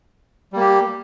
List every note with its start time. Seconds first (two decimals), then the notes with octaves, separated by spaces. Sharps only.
0.53 G3
0.57 A#3
0.60 G4